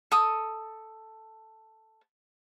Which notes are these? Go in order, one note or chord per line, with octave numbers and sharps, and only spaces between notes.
A4 D#6